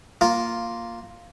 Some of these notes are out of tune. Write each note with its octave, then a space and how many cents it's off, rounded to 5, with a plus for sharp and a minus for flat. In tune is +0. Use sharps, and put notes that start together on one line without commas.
A#3 -5 F4 +0